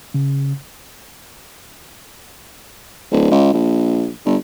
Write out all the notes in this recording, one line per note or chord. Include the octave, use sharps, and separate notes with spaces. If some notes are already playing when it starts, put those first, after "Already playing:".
C#3
D1
C#2
A#1
G1